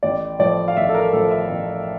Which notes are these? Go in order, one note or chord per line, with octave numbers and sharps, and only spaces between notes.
A1 D5
A2 F3 D5
F5
A1 E5
A4
A#4
A2 F3 A4
E5
A1